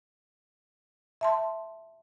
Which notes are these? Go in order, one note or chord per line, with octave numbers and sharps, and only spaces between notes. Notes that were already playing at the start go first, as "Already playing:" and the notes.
E5 A5 C6